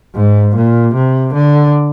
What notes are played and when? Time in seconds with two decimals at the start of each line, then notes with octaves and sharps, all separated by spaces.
0.15 G#2
0.55 A#2
0.95 C3
1.34 D3